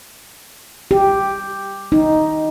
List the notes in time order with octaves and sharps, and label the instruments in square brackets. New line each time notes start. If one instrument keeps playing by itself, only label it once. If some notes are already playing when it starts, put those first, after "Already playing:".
[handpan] G4
D#4